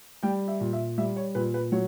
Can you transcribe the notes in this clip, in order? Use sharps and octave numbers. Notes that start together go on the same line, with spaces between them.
G3 G5
E5
A#2
E5
G3 E5
C#5
A#2 B4
B4
F#3 C#5